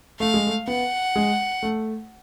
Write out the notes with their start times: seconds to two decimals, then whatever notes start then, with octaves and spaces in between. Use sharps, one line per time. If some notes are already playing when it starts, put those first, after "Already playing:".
0.20 A3 F5
0.34 G#3
0.47 A3
0.67 B3 F#5
1.16 G#3
1.63 A3